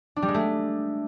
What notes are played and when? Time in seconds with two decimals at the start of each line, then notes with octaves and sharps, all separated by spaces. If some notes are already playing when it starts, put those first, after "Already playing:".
0.16 D4
0.22 G3
0.28 G#3
0.34 A3